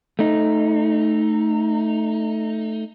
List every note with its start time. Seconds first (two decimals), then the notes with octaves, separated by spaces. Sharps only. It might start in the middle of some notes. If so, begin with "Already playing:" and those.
0.19 A3 D#4